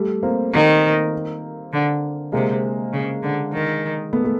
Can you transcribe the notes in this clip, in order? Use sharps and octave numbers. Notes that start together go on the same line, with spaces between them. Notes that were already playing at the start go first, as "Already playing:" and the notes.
Already playing: G3 A3
A#3 C4
D#3 A#3 C4
D3
C3 G#3 A#3
C#3
D3
D#3
A3 B3
A3